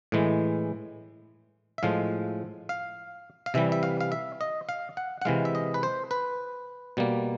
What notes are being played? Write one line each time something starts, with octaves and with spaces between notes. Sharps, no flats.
A2 E3 G#3
E5
A2 F3 G#3 F5
F5
F5
C3 E3 G3 E5
E5
F5
F5
E5
D#5
F5
F#5
F#5
C3 E3 G#3 F5
E5
D#5
B4
C5
B4
B2 G3 A#3